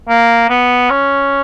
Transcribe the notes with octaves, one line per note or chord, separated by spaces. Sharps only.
A#3
B3
C#4